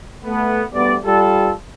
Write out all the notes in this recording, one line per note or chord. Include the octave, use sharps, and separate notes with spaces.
A3 B3
D2 G3 B3 D5
G3 F4 A4